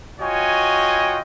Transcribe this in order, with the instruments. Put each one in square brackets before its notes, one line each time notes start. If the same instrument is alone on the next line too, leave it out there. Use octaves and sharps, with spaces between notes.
[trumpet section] F4 F#4 C#5 D#5 G5 G#5